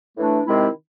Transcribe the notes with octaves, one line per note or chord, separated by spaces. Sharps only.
A2 E3 A3 D4
C3 D#3 G#3 C4 E4